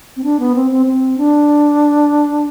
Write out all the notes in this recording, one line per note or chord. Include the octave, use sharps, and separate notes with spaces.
C4
D4
B3
C4
C4
C4
D4